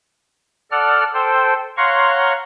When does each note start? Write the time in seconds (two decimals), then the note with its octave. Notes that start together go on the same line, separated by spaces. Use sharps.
0.71 A4 D5 F#5 F6
1.14 A4 C5 G5
1.77 C#5 F5 F#5 A#5 C6 C#6